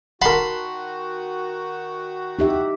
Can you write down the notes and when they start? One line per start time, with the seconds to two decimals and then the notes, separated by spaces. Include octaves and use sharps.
0.22 D#3 F#4 A#4 F#5 A5 B5 C6
2.39 D#4 G4 E5